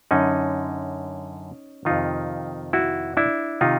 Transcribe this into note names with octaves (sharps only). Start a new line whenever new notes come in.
F#2 D3 C#4 D#4
F2 C3 D#3 D#4 F4
E4 F#4
D4 E4
C3 D#3 D#4 F4